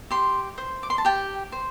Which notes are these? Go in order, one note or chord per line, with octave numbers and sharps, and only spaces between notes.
G4 C6
C5
D6
C6
A5
G4 G5
C5